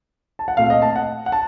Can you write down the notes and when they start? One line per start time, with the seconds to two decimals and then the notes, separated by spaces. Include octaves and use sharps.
0.39 A5
0.48 F#5
0.57 A#2 A3 C4 F5
0.70 D#5
0.82 A5
0.96 F#5
1.26 F#5
1.32 A5